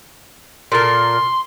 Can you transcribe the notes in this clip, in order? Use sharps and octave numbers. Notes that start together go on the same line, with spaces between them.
A#2 A4 A#4 C6